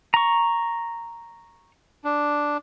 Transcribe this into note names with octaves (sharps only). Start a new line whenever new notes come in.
A#5 C#6
D4